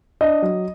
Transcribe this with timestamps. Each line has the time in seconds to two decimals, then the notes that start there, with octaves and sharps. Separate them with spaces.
0.21 D4 D#5
0.42 F#3